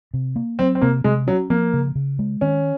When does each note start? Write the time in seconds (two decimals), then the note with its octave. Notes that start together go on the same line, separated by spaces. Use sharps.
0.14 C3
0.36 A#3
0.59 F#3 C4
0.75 C4
0.82 C3 A#3
1.04 C3 G#3
1.27 F#3 C#4
1.50 F3 A#3
1.74 C#3
1.95 C#3
2.19 G#3
2.41 D#3 C#4